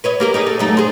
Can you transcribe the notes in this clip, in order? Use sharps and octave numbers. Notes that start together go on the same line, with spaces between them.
B4 C#5 D#5
A#3 G4 A#4
D#4 G4 G#4
A3
F#2 A3 D#4
G#4 C5